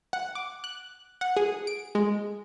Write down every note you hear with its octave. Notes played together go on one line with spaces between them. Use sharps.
F#5
D6
F#6
F#5
G#4
D7
G#3